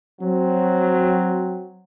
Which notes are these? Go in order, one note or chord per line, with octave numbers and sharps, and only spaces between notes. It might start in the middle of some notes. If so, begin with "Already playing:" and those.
F#3 C4